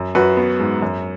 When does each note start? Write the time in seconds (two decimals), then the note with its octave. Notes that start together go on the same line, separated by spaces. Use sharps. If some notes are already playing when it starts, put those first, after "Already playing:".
Already playing: F#2
0.15 F#2 F#4 B4
0.37 B3
0.60 G#2
0.82 F#2